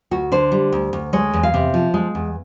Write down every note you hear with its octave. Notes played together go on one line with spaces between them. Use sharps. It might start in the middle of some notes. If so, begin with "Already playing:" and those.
D2 F#4
D3 C5
G3
D2
D2
G#3 C#5
E2
F5
C3
F3
G#3
E2